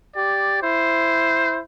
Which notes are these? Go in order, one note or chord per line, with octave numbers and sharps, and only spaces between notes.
G4 D5
E4 C5